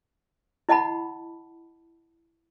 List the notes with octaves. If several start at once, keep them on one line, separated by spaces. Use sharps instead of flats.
E4 D#5 F#5 A5 B5